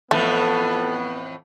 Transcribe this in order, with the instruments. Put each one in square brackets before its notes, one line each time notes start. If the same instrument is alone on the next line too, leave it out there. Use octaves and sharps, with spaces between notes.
[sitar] F2 A2 E3 [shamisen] A3 [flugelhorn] B3 [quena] A4